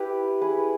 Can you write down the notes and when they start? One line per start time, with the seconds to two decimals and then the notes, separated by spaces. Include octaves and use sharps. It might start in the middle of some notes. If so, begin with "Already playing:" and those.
Already playing: E4 G4 B4
0.41 E4 G#4 B4